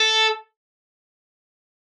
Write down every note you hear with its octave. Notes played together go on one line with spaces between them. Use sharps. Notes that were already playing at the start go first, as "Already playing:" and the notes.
Already playing: A4